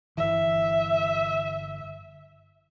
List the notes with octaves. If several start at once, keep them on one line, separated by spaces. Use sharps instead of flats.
G1 E3 E5